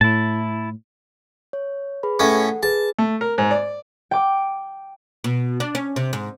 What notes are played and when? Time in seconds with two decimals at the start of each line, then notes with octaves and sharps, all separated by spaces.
0.01 A2 E4 A5
1.53 C#5
2.03 G#4 B4 B5
2.19 A2 C#4 A4 F#5
2.63 G#4 B4 A5
2.98 A3
3.21 A#4
3.38 G#2
3.51 D5
4.11 G5 D6
5.24 B2
5.60 D4
5.75 C#4
5.96 C3
6.13 G#2